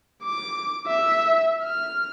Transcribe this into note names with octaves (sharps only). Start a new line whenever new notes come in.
D6
E5
F6